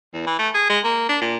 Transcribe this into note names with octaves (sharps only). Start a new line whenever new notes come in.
E2
E3
A3
G#4
G#3
A#3
D4
A#2